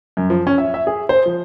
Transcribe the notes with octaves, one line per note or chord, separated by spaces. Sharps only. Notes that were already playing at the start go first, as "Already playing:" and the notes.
F#2
F3
C#4
E5
E5
G#4
C5
F3